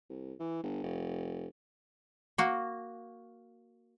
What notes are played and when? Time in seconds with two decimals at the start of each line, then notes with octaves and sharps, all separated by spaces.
0.10 C2
0.40 E3
0.63 G1
0.83 F1
2.38 A#3 F#4